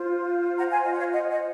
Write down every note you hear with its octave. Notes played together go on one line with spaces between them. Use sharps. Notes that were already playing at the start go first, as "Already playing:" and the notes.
Already playing: F4 C5
F#5 A#5
F5 G#5
D#5
F#5
C#5 F5
D#5 F#5
D#5 F#5